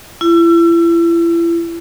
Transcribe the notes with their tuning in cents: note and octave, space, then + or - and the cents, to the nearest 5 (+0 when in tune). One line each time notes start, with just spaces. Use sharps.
E4 +35